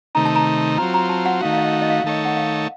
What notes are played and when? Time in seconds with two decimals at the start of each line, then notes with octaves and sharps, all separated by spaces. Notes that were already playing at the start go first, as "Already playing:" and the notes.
0.15 C3 D#3 A3 D#4 A#5
0.25 A5
0.36 A#5
0.78 F#3 C4 F4 A#5
0.94 A#5
1.09 A5
1.26 F#5
1.41 D#3 A3 D#4 F#4 F5
1.52 F5
1.57 D#5
1.72 F5
1.82 D#5
1.89 F5
2.04 D#3 A3 D#4 A4 C#5
2.25 F#5
2.36 F5